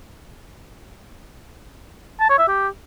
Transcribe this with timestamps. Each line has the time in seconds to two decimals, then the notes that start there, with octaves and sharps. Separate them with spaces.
2.20 A5
2.29 C#5
2.39 E5
2.48 G4